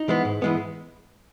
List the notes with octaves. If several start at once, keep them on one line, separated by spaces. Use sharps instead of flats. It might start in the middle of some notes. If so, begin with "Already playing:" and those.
Already playing: D#4
E3 G#3 B3
G#2
E3 G#3 B3